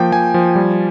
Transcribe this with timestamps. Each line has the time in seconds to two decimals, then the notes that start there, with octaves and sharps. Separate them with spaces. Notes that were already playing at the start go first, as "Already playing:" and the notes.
Already playing: F3 A#3 G5
0.12 F3 G#5
0.34 F3
0.56 G3